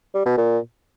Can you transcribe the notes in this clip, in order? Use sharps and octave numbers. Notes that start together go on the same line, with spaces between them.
G3
B2
A#2